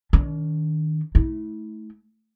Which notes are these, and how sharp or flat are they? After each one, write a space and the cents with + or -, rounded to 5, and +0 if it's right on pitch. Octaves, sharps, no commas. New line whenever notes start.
D#3 +0 D4 -45
A3 -15 E4 -35